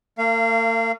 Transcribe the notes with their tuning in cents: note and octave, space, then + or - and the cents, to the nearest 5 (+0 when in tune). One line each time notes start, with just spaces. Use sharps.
A#3 -45 F5 -25